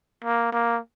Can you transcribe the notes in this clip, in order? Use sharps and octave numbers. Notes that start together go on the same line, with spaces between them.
A#3
A#3